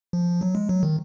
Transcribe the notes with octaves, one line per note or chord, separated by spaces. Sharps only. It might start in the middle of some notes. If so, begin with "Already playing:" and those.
F3
F#3
G#3
F#3
D#3